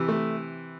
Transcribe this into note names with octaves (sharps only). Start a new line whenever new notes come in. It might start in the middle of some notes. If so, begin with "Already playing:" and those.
Already playing: C3 E3
A3